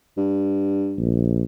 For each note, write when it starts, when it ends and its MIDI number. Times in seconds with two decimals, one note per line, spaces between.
0.17 1.04 43
0.98 1.43 34